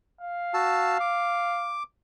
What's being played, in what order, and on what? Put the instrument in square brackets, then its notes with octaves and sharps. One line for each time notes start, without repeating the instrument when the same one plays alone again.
[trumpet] F5
[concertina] F#4 A5 E6
D6